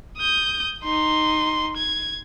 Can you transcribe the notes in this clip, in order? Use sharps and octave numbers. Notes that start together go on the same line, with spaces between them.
D#6 G6
D#4 C6
G#6